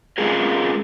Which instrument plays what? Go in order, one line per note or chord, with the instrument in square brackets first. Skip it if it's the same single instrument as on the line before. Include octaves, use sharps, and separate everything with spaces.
[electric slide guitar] G#3 C#4 F4 G#4 A#4